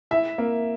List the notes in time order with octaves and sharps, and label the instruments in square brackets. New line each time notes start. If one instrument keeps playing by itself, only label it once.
[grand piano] E4 [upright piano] E5
[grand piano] A#3